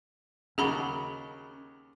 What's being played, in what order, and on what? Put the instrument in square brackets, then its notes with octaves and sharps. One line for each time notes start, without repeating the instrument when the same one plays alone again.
[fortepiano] D#2 C#3 F#4 [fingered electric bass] C#4 [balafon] G#4 A#5 B5